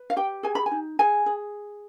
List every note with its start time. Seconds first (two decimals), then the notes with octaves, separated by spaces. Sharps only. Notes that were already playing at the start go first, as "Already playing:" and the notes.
Already playing: B4
0.10 F5
0.16 G4 G5
0.43 G#4 G#5
0.55 B5
0.66 G#5
0.71 D#4
0.99 G#4 G#5
1.26 G#4